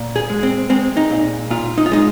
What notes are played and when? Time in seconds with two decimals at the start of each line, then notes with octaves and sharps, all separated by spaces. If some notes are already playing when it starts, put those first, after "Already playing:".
Already playing: A#2
0.16 G#4
0.30 G#3
0.43 C4
0.70 G#3 C4
0.97 D#4
1.10 A#2
1.50 A#2 F4
1.78 D#4
1.86 F4
1.92 G#3 D#4